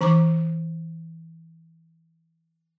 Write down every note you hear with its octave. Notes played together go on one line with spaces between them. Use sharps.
E3 A#5 C#6 D6